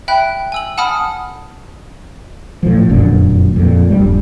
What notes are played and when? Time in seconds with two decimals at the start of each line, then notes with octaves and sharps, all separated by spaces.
0.08 E5 G5 B5 F#6
0.52 G#5 E6 F#7
0.78 F#5 A5 B5 D#6 F6
2.63 A2 F3
2.89 F1 F#2 A#2 D3
3.56 F2 A#2
3.90 D#1 G2 G3